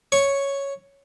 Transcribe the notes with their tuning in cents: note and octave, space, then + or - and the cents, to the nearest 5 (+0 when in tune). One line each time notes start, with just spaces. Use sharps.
C#5 +0 C#6 +0